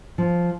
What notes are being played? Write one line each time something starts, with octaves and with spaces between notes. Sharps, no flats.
F3